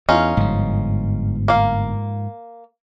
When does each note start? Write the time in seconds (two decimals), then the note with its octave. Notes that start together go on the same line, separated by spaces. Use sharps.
0.09 E2 C#4 D#4 F4
0.37 G1 G#2 F3
1.48 A#3 F5